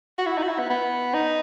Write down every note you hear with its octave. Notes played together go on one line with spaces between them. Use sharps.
F#4
E4
D#4
F#4
E4
B3
B3
D#4